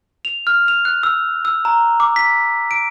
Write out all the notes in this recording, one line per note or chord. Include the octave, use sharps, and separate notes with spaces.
F7
F6
F7
F#6
E6
E6
A#5
D6
B6
D7